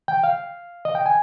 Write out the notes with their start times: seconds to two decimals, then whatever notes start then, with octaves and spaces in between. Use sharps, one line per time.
0.08 G5
0.24 F5
0.85 D#5
0.95 G5
1.06 G#5